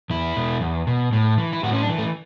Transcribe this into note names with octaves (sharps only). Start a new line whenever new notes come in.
E2 E4
B2
E2
B2
A2
E3
E4
A2 F#4
C#4
D4
E3
A3